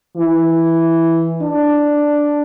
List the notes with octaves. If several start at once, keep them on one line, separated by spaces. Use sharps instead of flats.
E3
D4